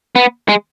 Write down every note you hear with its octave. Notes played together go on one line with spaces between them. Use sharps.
B3
G#3